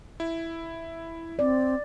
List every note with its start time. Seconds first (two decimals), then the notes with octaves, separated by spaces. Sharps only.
0.20 E4
1.39 C4 D5